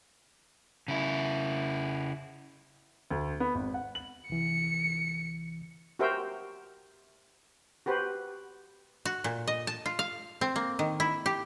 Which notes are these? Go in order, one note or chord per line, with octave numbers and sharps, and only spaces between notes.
C#3 E4
D2
B3
G#1
F#5
F#7
C2 E3 C#7
F#4 G4 A#4 C5 E5 G5
F#4 G4 B4 C5
F#4
A#2
D#5
A5
F4
F5
C4
A#3
D#3
E4
G4